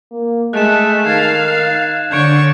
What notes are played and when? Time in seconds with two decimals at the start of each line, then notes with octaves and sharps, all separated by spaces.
0.11 A#3
0.53 G#3 A3 F#6 E7
1.06 D#3 F5 G#6 A6
2.11 D3 D4 C#5 C#6 G6 G#6 D7